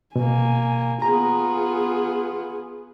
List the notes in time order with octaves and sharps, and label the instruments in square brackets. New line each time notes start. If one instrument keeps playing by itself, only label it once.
[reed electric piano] B2 [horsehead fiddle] A#3 G#5
[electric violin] B3 F4 [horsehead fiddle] G#4 [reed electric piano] A#5